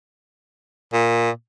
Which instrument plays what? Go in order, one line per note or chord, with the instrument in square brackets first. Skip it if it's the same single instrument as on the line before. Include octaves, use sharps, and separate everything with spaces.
[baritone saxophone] A#2